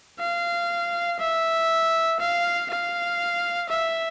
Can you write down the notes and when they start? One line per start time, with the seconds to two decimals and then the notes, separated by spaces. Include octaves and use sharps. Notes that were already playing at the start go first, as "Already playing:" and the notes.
0.20 F5
1.20 E5
2.20 F5
2.70 F5
3.69 E5